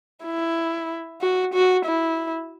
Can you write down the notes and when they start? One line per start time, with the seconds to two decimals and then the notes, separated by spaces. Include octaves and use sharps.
0.24 E4
1.21 F#4
1.54 F#4
1.85 E4